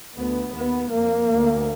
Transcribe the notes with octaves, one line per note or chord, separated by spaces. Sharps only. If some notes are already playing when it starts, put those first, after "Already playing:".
D2 B3
D#2 B3
F2 A#3
D2